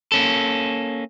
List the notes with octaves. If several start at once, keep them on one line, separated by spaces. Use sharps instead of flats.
A#3 C#4 A4